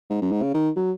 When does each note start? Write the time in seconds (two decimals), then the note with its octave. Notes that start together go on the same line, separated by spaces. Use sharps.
0.10 G#2
0.22 F#2
0.32 G#2
0.42 C#3
0.54 D#3
0.76 F#3